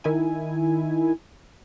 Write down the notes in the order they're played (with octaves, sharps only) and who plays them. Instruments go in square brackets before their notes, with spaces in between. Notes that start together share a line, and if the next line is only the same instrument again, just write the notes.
[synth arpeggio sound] D#3 E4 G#5